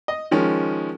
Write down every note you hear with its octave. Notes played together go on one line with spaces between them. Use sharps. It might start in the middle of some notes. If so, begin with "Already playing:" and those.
D#5
D#3 F3 G#3 C#4